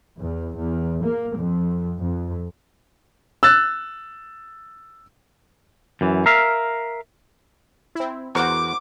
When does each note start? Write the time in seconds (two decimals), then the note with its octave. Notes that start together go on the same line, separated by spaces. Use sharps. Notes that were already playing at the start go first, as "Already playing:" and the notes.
0.18 E2
0.54 E2
1.03 A#3
1.35 F2
2.01 F2
3.43 E6 F#6 A6
6.01 F#2 E3
6.26 A#4 E5 F5
7.95 C4 E4
8.35 E2 F#4 A#4 C5 F#5 D6